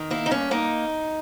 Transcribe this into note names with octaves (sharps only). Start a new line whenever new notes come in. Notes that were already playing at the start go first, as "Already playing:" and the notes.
Already playing: D#3
A#3 E4
D#4
G2 C#4
A#3 D#4